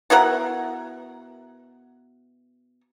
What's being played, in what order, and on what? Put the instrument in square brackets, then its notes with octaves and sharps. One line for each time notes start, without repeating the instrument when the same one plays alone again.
[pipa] B2 E4 A#4 F#5